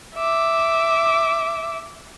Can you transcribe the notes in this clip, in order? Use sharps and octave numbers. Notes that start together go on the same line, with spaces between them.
E5 D6